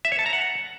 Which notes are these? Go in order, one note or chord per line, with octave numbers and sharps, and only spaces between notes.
E5
C#5
A5
A#5
F#5